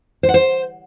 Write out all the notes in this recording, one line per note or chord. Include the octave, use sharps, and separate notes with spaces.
C5
F#5
C5